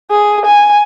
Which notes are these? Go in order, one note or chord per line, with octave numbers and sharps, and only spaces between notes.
G#4
G#5